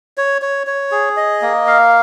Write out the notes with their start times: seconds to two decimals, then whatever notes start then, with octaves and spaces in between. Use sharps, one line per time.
0.18 C#5
0.42 C#5
0.67 C#5
0.92 G#4
1.17 D#5
1.42 A#3
1.67 F5